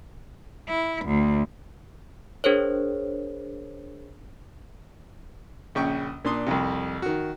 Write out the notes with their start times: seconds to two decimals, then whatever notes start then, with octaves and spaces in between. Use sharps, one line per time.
0.69 E4
1.06 D2
2.44 D4 G#4 A#4 C5 C#5
5.75 A#1 C#3 G5 C#6
6.25 A#2 D4 C6 D#6
6.46 C2 F2 C3
7.02 D#3 F#4